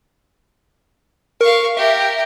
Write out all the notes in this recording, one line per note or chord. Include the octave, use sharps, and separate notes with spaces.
A#4 F5 C#6
G4 A#4 E5